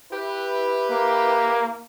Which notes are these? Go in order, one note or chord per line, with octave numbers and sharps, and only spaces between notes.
E4 G4 B4
A#3